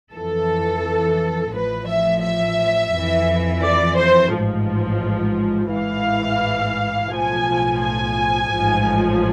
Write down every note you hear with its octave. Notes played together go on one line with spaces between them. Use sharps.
F2 E3 A4
A1 A2 F3 B4
E5
E5
F2 E3
D5
C5
A1 G#2 F3
A1 G#2 E3 F5
B1 A2 F3 G#5
G#5
A1 G#2 F3